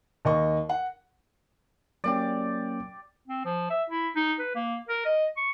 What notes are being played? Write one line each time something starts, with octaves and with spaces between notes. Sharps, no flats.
D#2 D#5 C#6
F#5
F#3 A#3 C#4 G4 D5
C4
F3
E5
E4
D#4
B4
A#3
A#4
D#5
C#6